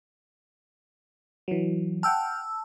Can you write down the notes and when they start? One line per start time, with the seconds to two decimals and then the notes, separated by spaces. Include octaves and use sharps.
1.48 E3 F#3
2.03 F#5 G5 A5 E6 F6